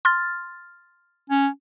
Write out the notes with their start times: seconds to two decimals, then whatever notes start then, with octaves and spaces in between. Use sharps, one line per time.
0.05 C6 F6 A6
1.30 C#4